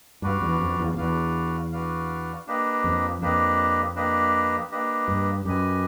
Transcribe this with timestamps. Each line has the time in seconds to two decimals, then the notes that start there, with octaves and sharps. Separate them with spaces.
0.22 G2 D4 F#4 B4 D5 F5
0.41 E2
0.61 F2
0.79 E2
0.93 F2
0.97 E2 D4 F#4 B4 D5 F5
1.72 D4 F#4 B4 D5 F5
2.47 A#3 D4 G4 B4 D#5
2.84 F2
3.21 F2 A#3 D4 G4 B4 D#5
3.96 A#3 D4 G4 B4 D#5
4.72 A#3 D4 G4 B4 D#5
5.08 G2
5.45 F#2 G4 B4 D#5 G#5